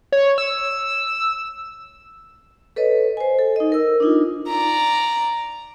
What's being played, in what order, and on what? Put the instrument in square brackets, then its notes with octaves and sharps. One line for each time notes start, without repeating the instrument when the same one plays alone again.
[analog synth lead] C#5
E6
[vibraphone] A4 B4 C#5 D#5
C5 G#5
A4
D#4 D#5
A#4 E6
D4 D#4 F4
[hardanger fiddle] D5 A#5